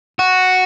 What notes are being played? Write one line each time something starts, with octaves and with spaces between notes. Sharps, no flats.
F#4